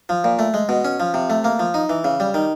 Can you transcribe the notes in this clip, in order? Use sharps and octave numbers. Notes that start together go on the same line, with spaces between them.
F3
A#2
A3
G#3
B2
C#4
F3
C3
A3
A#3
F3
D#4
E3
C#3
G3
D#3